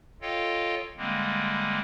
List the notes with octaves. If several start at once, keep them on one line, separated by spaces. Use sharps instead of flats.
F4 A4 C#5 D#5 F5 G5
D3 G3 G#3 A#3 C4